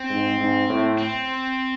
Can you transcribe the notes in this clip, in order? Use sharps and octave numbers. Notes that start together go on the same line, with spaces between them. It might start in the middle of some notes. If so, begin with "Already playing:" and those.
Already playing: C4
G#2
G#2
A2
C4